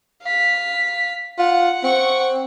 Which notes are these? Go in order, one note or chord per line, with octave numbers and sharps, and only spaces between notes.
F5 B6
F4 F#5
C4 F#5 C#6